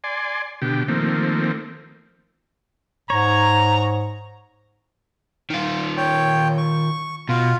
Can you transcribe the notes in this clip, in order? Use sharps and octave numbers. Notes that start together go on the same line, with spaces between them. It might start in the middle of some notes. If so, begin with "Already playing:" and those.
D5 G#5 C6
B2 D3 G4
D#3 F3 A3 A#3 C4
G#2 C#5 A#5
D#3 F4
C#5 G5
C#6
B2 F4